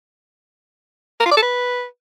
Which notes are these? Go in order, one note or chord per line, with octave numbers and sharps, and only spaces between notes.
A#4
F4
D5
A4
B4